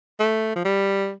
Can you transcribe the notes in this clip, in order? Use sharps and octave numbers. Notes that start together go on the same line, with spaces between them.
A3
F3
G3